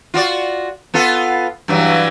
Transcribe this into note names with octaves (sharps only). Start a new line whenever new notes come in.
F4 F#4 D5
B3 F4 A4
G2 E3 F#3